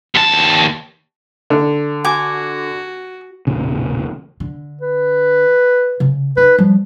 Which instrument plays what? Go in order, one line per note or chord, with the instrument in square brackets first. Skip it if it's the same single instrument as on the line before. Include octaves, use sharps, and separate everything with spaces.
[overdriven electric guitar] D#2 A5
[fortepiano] D3
[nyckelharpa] F#4 [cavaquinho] G#5 D6
[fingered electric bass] E1 A1 A#2 C#3
[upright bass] D3
[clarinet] B4
[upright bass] C#3
[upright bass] D#4 [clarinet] B4
[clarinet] F3 [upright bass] G3